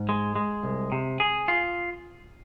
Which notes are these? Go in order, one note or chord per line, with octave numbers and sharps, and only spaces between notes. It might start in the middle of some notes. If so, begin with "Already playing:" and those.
Already playing: G#2
G#3
G#3
C2
C3
G#4
F4